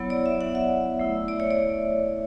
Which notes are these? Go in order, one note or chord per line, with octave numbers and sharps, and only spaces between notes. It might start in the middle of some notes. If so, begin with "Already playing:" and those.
Already playing: F#3 B3 E4 C#5
D5
E5
F#5
E5
A3 E4
D5
C#5
D5